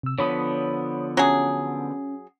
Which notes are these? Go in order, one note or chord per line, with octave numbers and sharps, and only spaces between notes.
C3 E6
D3 F3 B3 C#5 B5 D#6
F#3 C#4 G#4